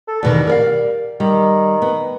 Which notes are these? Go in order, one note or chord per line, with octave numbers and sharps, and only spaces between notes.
A4
E2 B2 D#3 G3
A#4 D5 F5
D#3 G3
B3